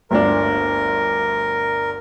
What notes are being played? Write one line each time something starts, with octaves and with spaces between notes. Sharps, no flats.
G1 D2 D4 A#4